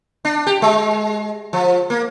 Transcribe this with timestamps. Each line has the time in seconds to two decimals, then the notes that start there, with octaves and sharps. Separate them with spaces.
0.25 D4
0.47 G4
0.62 G#3
1.53 F3
1.90 A#3